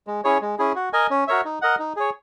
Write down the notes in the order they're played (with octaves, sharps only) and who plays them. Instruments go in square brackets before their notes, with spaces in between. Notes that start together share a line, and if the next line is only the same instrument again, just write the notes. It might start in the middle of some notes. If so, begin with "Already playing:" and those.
[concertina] G#3
C#4 E4 G#4 C#5
G#3
C#4 E4 G#4
F#4
A#4 D#5 G#5
C#4
F#4 A#4 C#5 E5
D#4
A#4 D#5 F#5
D#4
G#4 C#5